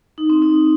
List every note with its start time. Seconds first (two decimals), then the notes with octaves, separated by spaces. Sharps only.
0.18 D#4
0.30 C4
0.42 D#4